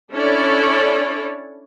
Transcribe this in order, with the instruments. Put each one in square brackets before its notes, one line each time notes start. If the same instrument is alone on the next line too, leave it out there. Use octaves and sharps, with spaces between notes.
[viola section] C#4 D4 E4 A4 C#5 D5